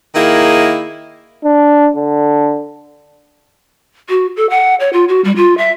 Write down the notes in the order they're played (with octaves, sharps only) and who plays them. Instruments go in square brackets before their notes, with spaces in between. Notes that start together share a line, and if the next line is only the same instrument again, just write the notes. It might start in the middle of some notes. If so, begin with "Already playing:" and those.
[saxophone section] D#3 A#3 E4 G#4
[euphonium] D4
D3
[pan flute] F#4
A4
F#5
C#5
F4
F#4
G3
F4
E5